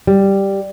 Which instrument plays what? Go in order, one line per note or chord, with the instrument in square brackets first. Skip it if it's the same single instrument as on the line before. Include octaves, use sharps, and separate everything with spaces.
[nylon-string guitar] G3